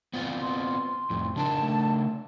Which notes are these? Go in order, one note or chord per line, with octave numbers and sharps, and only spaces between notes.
B3 C4 F4
C6
F2 A2
C#3 D4 A#4 A5
A3